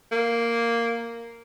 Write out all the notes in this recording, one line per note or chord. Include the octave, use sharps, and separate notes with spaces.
A#3